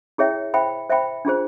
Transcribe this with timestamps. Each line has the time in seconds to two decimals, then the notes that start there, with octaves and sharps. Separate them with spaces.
0.18 E4 G#4 C#5 E5 G5
0.54 C5 E5 G5 B5
0.89 C5 E5 G5 B5
1.25 D4 F4 G#4 C5